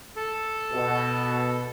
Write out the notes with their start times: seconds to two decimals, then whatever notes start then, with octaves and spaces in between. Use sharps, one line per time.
0.16 A4
0.72 B2